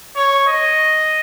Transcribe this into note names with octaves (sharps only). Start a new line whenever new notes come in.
C#5
D#5